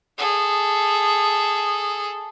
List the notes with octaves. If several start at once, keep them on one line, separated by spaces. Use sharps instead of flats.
G#4 A4